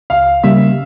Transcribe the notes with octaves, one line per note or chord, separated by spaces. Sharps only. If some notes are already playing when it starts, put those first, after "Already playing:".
C#2 F5
C#3 G3 A#3 E5